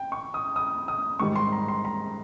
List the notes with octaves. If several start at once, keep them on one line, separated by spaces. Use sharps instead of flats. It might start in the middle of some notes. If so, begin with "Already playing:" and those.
Already playing: G5
C#6
D#6
D#6
D#6
G#2 D#3 G3 C#6
C6
A#5
C6
A#5